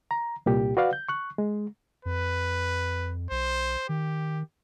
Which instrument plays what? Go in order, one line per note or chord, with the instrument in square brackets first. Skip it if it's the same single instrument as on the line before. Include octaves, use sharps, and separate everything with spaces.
[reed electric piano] A#5
C2 A#2 G4
F#4 B4 D5 F5 F#5
G6
C#6 F#6
G#3
[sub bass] F2 [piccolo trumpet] B4
[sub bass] B1 [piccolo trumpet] C5
[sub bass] D#3 [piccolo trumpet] G4